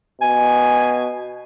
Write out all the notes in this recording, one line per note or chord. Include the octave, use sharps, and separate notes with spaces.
B2 G#5